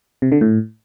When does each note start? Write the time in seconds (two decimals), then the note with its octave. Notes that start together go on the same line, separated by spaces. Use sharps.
0.22 C3
0.32 D3
0.41 A2